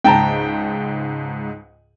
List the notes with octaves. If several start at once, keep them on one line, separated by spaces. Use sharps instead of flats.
C#2 G#2 G5 A5 A#5